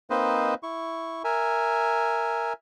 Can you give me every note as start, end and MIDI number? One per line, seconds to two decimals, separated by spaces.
0.10 0.54 58
0.10 0.54 60
0.10 0.54 63
0.10 0.54 71
0.10 0.54 72
0.10 0.54 75
0.63 1.23 64
0.63 1.23 85
1.24 2.53 70
1.24 2.53 76
1.24 2.53 80